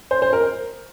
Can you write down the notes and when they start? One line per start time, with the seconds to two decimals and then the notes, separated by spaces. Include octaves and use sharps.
0.11 C5
0.22 C5
0.33 A#4